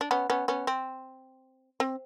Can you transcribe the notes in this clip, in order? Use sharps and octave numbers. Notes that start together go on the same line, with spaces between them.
D4
B3 C#4
B3 C#4
B3 C#4
C4
C4